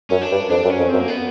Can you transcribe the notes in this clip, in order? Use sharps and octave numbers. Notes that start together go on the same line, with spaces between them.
F#2 C#4
D4
G2
F2 D4
F#2
C#4
F2
C4
F#2
A#3
B3